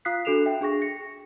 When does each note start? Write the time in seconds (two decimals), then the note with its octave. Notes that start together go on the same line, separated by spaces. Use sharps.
0.05 F4 F5 D#6 F#6 B6 C7
0.25 D4 F#4 A4 C7 E7 F7
0.46 E5 G5
0.61 D4 G#4 C#6 A#6
0.82 A#6 C#7